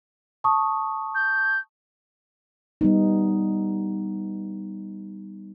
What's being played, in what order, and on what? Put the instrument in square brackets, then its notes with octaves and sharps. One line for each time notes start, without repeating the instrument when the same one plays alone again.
[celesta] A5 C#6 D#6
[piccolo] G6
[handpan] G3 B3 D#4